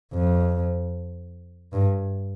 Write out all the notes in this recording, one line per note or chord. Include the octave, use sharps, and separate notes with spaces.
F2
G2